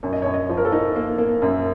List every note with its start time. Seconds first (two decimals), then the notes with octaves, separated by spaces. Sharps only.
0.03 F#2 C#5
0.13 D#5
0.22 F#2 C#5
0.34 D#5
0.49 F3
0.57 A#4
0.65 A4
0.72 D#4
0.96 A#3
1.18 A#3
1.42 F#2